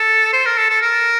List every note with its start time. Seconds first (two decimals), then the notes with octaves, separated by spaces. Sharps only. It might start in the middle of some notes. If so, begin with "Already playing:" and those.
Already playing: A4
0.33 C5
0.46 A#4
0.58 A4
0.70 A4
0.82 A#4